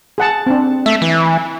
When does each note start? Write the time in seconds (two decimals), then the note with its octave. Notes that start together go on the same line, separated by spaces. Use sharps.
0.18 G#4 F#5 A5
0.46 C4 D4
0.86 A3 E5
1.02 E3